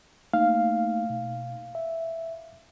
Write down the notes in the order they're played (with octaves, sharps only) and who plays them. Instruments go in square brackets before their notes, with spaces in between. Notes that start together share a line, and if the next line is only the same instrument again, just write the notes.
[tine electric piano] A3 A#3 D#4 [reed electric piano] F5
[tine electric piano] B2
E5